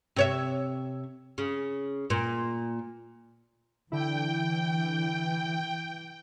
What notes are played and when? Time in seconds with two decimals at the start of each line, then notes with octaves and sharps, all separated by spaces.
0.16 C3 C#5 E5
1.38 C#3
2.10 A#2
3.92 D3 E3 E4 G5